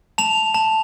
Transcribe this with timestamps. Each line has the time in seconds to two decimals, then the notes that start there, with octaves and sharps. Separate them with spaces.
0.18 A5 F7
0.55 A5